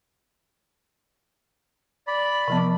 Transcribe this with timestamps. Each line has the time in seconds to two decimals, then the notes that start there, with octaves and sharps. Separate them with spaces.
2.07 D5 B5
2.48 C3 F3 B3